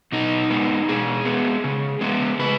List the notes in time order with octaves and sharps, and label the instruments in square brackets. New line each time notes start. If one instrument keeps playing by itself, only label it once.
[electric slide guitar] B2 D#4
G#3 B3
B2 G#4
G#3 B3
C#3
G#3 B3
C#3 B4